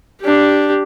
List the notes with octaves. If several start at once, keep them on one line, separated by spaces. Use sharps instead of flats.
D4 G4